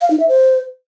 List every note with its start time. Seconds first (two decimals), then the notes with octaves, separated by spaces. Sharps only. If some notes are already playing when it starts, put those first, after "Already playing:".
0.01 F5
0.10 D#4
0.20 E5
0.29 C5